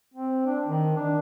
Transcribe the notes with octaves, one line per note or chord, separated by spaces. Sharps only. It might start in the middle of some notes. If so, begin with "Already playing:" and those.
C4
D4
D#3
D4